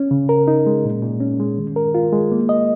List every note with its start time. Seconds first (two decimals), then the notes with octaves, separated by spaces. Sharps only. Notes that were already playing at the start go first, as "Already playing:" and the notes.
Already playing: C#4
0.11 C#3
0.29 A#4
0.48 D#4
0.66 G#3
0.85 A#2
1.02 A#2
1.20 C#4
1.40 G#3
1.58 D#3
1.76 A#4
1.95 F4
2.13 G#3
2.32 A#3
2.49 D#5